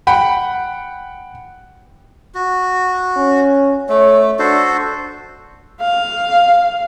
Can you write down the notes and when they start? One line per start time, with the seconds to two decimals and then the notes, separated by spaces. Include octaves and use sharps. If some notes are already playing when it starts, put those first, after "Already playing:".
0.07 F#5 G5 B5
2.35 F#4
3.16 C#4
3.89 A3 C#5
4.39 D4 F#4 A4 C5
5.81 F5